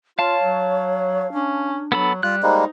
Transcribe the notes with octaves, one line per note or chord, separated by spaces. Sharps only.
F4 C#5 F5 A5
F#3
C#4 D4
F#3 B3 A4 B5
G3 F4 F#6
G3 G#3 A#3 D#4 C5